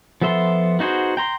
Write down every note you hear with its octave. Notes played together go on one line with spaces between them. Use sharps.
F3 B3 A4 E5 C6
B3 D#4 F#4 G#4 C5
G5 A#5 C6